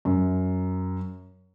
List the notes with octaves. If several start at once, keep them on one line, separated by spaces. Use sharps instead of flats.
F#2